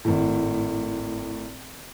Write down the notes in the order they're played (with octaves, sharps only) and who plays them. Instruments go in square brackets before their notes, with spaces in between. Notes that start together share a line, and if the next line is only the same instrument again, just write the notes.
[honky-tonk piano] G#1 A2